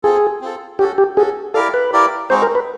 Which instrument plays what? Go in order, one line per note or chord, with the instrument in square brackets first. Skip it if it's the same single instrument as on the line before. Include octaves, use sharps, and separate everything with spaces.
[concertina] C4 F4 A4 [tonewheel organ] G#4
[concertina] C4 F4 A4
[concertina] C#4 F#4 A4 [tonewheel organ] G4
[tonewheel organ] G4
[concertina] C#4 F#4 A4 [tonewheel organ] G#4
[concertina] E4 G4 A#4 D5 F5 [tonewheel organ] A4
[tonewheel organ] B4
[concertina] E4 G4 A#4 D5 F5
[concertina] G#3 C4 D#4 F#4 [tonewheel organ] C5
[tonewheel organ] A#4
B4